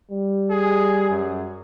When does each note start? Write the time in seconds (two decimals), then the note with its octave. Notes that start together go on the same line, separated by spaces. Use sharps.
0.11 G3
0.50 G#4
1.10 F#2